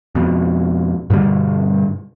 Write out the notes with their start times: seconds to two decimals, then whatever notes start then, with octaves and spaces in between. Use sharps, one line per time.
0.15 F2 B2
1.10 G2 B2 D3 G3